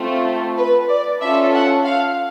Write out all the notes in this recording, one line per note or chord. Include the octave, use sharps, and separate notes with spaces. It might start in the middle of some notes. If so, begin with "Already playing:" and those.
Already playing: A3 C4 F4
B4
D5
C#4 F4 A4 E5
F#5
F5